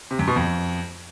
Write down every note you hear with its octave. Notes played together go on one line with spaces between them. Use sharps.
C3
F#2
B2
F2